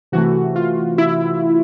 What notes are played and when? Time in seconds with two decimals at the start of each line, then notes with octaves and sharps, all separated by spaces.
0.12 C3 E3 A3 F#4
0.56 F4
0.98 E4